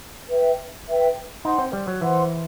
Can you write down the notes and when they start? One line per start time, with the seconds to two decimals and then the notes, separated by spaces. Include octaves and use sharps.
0.30 B4 E5 G5
0.88 B4 E5 G5
1.44 D#4 C5 F#5 C6
1.58 C4
1.73 G3
1.87 F#3
2.01 E3 C5 F#5 C6